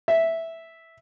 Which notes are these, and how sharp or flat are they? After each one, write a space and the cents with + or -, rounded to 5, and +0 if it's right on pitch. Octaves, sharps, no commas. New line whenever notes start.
E5 -5